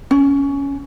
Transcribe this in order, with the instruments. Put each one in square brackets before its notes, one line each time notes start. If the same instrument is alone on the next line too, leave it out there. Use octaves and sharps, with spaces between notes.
[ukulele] C#4